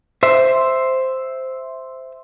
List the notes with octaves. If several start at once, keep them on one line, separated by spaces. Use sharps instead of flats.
C5 E5